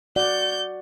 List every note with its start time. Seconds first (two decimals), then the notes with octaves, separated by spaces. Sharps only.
0.16 F#4 D5 F#5 G6